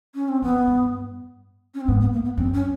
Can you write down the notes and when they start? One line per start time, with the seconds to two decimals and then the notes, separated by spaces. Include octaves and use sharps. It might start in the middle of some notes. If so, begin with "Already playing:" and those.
0.15 C#4
0.29 C4
0.42 F2 B3
0.67 G2
1.74 C#4
1.81 C4
1.88 G#2 B3
2.01 B3
2.13 A#3
2.25 B3
2.37 F#2 C4
2.54 C#4